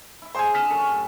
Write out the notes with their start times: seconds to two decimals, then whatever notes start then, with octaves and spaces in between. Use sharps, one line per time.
0.22 E4 E5
0.35 G#3 G#4 C5 G#5
0.54 D4 G#4 F6 B6 E7
0.70 F#2 F#4 A4 C#6
0.89 A2